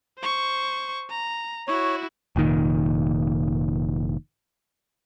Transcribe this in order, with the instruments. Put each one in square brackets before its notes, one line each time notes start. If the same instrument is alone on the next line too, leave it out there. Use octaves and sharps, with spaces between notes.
[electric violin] C5 C#6
A#5
[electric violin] E4 F#4 [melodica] C#5
[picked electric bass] F1 A#2 D#3